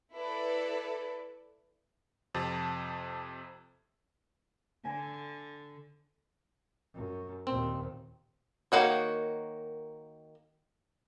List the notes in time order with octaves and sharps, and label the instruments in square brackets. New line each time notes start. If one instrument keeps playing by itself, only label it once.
[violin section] E4 A4 B4 D5
[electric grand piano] F2 C3 A5
[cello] D3 [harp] G#5
[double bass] F#2
[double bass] D#2 A#2 [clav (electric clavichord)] C4
[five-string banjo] D#3 E3 A#3 F#4 C#5